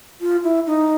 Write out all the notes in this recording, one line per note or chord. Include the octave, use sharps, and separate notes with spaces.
F4
E4
D#4